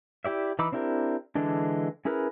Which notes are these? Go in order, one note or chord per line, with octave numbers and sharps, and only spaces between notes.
E4 G4 D5 E5
E3 D#4 B5 D6 E6
C4 D4 E4 G4 A#4
D3 E3 G#3 D4
C#4 E4 G#4 A#4 B4